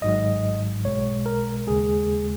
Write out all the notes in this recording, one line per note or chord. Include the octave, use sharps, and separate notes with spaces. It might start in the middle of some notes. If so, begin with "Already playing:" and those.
G#1 G#2 F#3 D#5
B1 B2 G#3 C#5
A#4
D#2 C#3 G#3 G#4